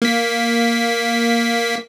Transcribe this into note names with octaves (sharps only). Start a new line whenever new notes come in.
A#3 B6